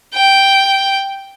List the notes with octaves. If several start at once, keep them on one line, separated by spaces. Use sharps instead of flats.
G5